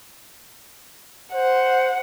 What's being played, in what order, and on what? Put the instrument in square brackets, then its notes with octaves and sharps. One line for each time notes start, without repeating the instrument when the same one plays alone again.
[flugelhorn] C5 [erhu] F#5